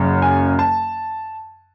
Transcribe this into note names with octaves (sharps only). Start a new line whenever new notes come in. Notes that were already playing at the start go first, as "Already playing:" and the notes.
Already playing: F#1 F#2 C#3 F#3
G#5
A5